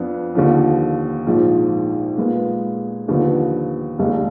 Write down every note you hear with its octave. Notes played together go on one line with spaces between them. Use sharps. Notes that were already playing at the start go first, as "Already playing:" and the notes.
Already playing: F2 F3 B3 D4
D#2 D3 F3
A#1 G#2 F3
A#2 G#3 B3
D#2 D3 F3 B3
F1 D#2 D#3 G#3